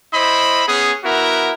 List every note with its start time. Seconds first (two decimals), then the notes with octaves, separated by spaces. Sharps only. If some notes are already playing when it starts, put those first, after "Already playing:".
0.14 E4 C5 D#5 B5
0.68 B3 C#4 G#4
1.04 B3 E4 F#4 A#4